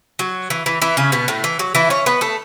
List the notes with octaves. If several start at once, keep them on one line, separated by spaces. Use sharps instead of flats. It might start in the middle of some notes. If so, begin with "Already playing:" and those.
F#3
E3
E3
E3 E4
C#3 C#4
B2 B3
A2 A3
E3
F#3
E3 E4
C#4 C#5
B3 B4
A3 A4